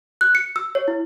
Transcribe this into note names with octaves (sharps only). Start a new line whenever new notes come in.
F#6
C#7
E6
C#5
E4